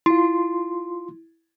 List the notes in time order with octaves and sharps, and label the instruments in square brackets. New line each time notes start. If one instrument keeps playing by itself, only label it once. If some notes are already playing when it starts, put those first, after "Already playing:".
[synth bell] E4 [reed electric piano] F4 C6